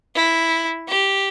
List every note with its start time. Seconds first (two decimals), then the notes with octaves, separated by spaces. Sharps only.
0.15 E4
0.88 G4